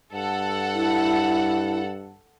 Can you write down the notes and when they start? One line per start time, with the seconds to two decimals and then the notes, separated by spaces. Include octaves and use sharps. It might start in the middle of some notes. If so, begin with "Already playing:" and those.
0.13 G2 A4 F#5
0.74 E4